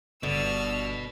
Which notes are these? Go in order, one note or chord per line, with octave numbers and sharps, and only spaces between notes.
G1 B2 D3 E6 F6